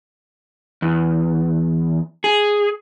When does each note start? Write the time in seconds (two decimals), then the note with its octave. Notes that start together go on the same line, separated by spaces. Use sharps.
0.82 E2
2.24 G#4